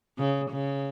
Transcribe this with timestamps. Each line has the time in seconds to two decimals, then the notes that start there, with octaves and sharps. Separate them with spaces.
0.19 C#3
0.51 C#3